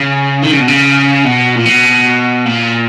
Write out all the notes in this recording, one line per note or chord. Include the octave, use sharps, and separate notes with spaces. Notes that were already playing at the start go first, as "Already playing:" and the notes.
Already playing: C#3
D#3
C#3
B2
C#3
B2
A#2
B2
A#2